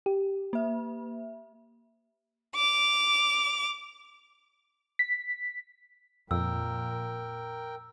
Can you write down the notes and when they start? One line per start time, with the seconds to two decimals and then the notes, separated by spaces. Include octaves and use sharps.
0.06 G4
0.53 A#3 E5
2.56 D6 F7
4.99 B6
6.31 F2 A#2 A#4 G5 E6